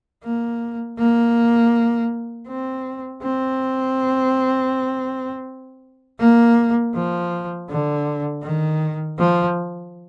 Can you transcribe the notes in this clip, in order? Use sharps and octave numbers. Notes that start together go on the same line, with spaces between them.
A#3
A#3
C4
C4
A#3
F3
D3
D#3
F3